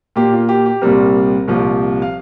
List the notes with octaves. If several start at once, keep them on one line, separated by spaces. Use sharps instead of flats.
A#2 A#3 G4
F4
G4
G4
C2 A#2 G3 C4 A#4
C2 A#2 F3
F5